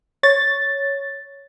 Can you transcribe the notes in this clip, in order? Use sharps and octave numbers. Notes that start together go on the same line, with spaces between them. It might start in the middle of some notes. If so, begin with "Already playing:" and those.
C#5 A6